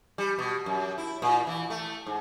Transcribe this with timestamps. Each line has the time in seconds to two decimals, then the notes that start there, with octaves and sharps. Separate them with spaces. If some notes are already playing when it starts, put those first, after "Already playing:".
0.18 G3
0.39 B2
0.66 F#2
0.98 E4
1.22 A#2
1.47 E3
1.70 A3
2.06 G#2